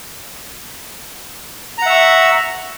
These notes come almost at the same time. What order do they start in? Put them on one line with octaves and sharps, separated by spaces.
A#5 F#5 E5 C#6